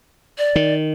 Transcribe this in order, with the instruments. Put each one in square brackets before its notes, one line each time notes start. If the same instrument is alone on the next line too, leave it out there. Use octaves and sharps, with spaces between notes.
[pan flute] D5
[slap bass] D#3